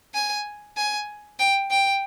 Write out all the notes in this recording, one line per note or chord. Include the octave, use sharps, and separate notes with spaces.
G#5
G#5
G5
G5